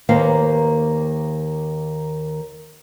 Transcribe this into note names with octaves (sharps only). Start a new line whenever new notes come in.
D#2 D#3 A#3 B4 C5 F5